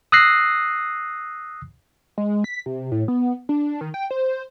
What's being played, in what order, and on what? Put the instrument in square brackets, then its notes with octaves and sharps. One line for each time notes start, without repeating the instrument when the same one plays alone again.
[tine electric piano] D#6 E6 F#6 A#6 C7
[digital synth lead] G#3
B6
C3
A2
B3
D4
D#3
G5
C5